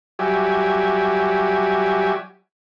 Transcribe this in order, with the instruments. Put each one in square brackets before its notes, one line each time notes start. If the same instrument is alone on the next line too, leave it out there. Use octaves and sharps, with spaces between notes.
[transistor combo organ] F#3 G3 F#4 G4 E5 G#5